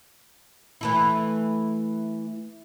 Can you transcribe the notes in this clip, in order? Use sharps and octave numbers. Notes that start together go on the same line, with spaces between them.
E3 A3 E4